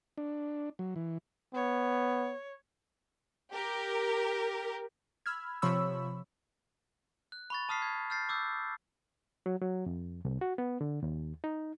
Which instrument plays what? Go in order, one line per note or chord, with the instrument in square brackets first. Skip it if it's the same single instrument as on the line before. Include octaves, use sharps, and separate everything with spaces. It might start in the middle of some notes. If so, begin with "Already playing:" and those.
[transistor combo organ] D4
F#3
E3
[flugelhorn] B3 [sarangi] C#5
[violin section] G4 A#4
[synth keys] B5 E6 F6 G#6
C3 F3 C#5 B5 C#6 E6
[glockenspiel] F#6
B5 C#6 A6
A5 D#6 F6 B6 C7
G#6
F6 G6 A6 C7
D6 E6 G6
[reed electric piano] F#3
F#3
F2
C2
F#4
B3
D3
D#2
D#4